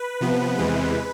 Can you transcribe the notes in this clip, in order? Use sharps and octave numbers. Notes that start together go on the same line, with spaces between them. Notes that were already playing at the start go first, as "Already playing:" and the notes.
Already playing: B4
C3 F3 B3
E2 C3 E3 G#3